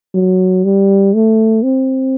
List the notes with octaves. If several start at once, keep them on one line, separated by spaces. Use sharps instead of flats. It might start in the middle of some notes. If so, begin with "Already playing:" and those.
F#3
G3
A3
C4